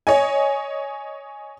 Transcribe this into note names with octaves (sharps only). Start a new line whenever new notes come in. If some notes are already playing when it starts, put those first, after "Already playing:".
C#5 D#5 G#5